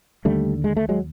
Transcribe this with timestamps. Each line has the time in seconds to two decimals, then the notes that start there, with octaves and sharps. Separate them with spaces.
0.25 D#2 D3 G3 A3
0.64 G#3
0.77 A3
0.89 F#3 G#3